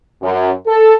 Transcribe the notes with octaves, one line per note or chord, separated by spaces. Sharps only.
F#2
A4